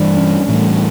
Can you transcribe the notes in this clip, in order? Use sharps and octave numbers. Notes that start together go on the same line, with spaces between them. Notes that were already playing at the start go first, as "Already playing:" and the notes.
Already playing: G2 E3 G3 D4
C#4
A2 E3 G3 A3 C#4